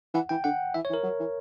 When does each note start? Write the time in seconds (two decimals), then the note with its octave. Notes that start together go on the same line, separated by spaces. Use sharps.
0.14 E3 F#5
0.29 E3 G5
0.44 D3 F#5
0.74 E3 E5
0.85 C#5
0.90 E3
0.94 A#4
1.03 F#3
1.19 E3